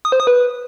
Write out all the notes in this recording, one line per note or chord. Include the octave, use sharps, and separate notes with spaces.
D#6
C5
D#6
B4